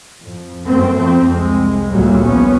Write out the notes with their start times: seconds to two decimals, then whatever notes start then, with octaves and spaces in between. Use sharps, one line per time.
0.23 F2
0.65 F#2 A3 C4
0.96 F2 C4
1.34 C2 G#3
1.92 F#1 D2 A#2 F#3 G3
2.21 A#1 F3 G3 B3 C#4